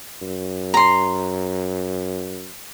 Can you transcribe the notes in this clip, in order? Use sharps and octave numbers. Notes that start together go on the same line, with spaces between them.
F#2
A#5 C6